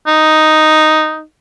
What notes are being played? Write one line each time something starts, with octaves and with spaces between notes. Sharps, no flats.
D#4